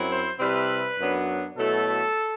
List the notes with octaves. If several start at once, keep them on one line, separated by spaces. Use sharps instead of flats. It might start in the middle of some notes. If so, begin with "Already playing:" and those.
Already playing: F#2 F#3 C4 E4
C5
C3 G3 C4 E4 B4
F#2 F#3 B3 D4
B2 F#3 A3 E4 A4